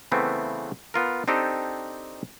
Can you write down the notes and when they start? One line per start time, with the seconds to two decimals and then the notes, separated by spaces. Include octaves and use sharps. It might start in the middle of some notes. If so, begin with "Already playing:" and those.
0.12 C#3 E3 A3 B3 C4
0.94 B3 F4 A#4
1.28 C4 D4 D#4 G4 A4